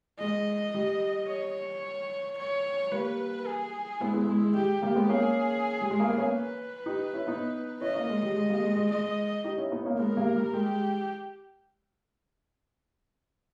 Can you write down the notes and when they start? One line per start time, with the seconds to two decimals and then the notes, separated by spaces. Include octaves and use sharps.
0.19 G#3 D#5
0.74 G3
1.28 C#5
2.38 C#5
2.92 G3 A#3 B4
3.47 G#4
4.00 G#3 B3 E4
4.14 G#3 B3
4.27 G#3
4.42 G#3
4.55 G3 G4
4.82 G3 A#3
4.96 G#3 B3
5.09 A#3 C#4 G#4
5.81 G3
5.91 G#3
6.00 A#3
6.09 B3
6.18 A#3 C#4 B4
6.86 D#4 G4
7.13 C#4 E4
7.27 B3 D#4
7.81 C#4 E4 D#5
7.95 A#3 C#4
8.09 G#3
8.23 G3
8.36 G#3
8.50 G3 A#3
8.63 G#3
8.77 G#3
8.91 G#3 D#5
9.44 D#4 G4
9.58 C#4 E4
9.72 B3 D#4
9.85 A#3 C#4
9.99 G#3 B3 A#4
10.17 G3 A#3
10.36 G3
10.53 G#3 G4